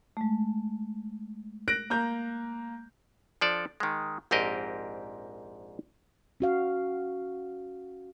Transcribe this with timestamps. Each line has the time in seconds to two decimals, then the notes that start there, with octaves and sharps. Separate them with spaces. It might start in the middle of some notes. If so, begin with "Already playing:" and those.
0.17 G#3 A3
1.68 F#6 A#6 D7
1.90 A#3 A#5 G6
3.41 F3 D4 A4 D5
3.80 D#3 G#3
4.31 A#1 G#2 C4 G4 A#4 D#5
6.40 C#4 F#4 F5